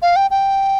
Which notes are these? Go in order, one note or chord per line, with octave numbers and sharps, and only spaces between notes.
F5
G5
G5